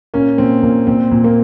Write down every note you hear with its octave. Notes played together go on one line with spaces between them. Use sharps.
A#2 A#3 C#4
A#2 C4
A#2 A#3
A#2 C4
A#2
A#3